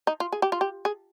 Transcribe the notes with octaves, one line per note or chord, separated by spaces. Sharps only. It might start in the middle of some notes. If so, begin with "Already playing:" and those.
D#4
F4
G#4
G4
F4
G4
G#4